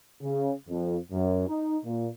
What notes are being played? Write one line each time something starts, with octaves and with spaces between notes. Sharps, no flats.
C#3
F2
F#2
D#4
A#2